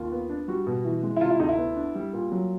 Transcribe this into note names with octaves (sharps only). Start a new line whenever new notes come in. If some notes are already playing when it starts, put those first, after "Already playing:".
Already playing: D#2 F4
B3
D4
G3 F#4
B2
E3
G#3
E4
C3 F4
E4
D2 D#4
E4
B3
D4
G3
A#2
F#3